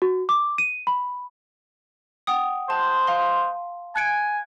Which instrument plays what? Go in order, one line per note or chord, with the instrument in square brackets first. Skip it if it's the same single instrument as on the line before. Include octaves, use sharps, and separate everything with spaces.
[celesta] F#4
D6
D#7
B5
[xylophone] F#5 G5 D#6
[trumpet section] G#3 C5 [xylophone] A5
[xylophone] F5 C6
[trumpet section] G#5 [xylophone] F#6 C#7 D7